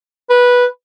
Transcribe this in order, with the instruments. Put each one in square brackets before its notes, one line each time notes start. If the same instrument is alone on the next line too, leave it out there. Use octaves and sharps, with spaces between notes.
[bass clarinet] B4